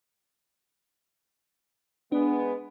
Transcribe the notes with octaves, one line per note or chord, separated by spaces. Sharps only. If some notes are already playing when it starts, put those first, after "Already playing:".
G#3 B3 D4